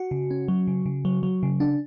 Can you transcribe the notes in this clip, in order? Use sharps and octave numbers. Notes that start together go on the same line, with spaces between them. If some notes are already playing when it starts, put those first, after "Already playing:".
Already playing: F#4
C#3
C#4
F#3
C#3
C#3
F#3
F#3
C#3
D4